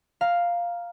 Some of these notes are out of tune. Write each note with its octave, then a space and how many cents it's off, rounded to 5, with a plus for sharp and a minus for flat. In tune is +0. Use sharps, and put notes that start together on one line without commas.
F5 +0 A#5 +0